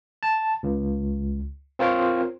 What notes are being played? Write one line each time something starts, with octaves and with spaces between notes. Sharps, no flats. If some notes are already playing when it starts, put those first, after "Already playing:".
A5
C#2
C4 F4 A#4 C5 C#5